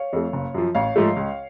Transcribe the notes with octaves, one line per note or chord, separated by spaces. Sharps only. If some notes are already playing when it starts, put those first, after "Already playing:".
Already playing: C#5 F5
F2 F3 A3
F#1
F#2 F3
A1 C#5 F5
G#2 F3 A3
C#2